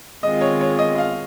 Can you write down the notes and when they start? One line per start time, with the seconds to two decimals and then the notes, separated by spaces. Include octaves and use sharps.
0.23 D#3 G#3 C4 F4 D#5
0.41 C#5
0.61 C#5
0.79 D#5
0.98 F5